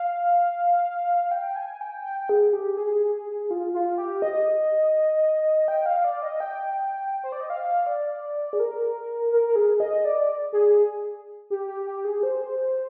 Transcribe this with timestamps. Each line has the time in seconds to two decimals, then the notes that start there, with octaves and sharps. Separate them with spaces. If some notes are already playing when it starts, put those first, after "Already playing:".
Already playing: F5
1.31 G5
1.56 G#5
1.81 G5
2.05 G5
2.29 G#4
2.53 G4
2.77 G#4
3.51 F4
3.74 F4
3.98 G4
4.22 D#5
5.68 G5
5.86 F5
6.04 D5
6.23 D#5
6.40 G5
7.24 C5
7.32 D5
7.41 D#5
7.50 F5
7.86 D5
8.53 G#4
8.60 A#4
9.32 A#4
9.47 A#4
9.56 G#4
9.80 D#5
10.05 D5
10.53 G#4
11.50 G4
11.68 G4
11.86 G4
12.05 G#4
12.23 C5